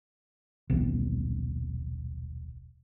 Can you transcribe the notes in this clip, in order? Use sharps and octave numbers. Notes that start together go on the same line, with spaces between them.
D#1 B1